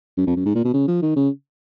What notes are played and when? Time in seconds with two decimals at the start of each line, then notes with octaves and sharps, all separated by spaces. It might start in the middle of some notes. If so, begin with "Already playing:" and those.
0.17 F#2
0.27 F2
0.36 F#2
0.45 G#2
0.55 A#2
0.64 B2
0.73 C#3
0.88 F3
1.02 D#3
1.16 C#3